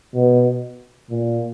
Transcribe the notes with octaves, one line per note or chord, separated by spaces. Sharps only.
B2
A#2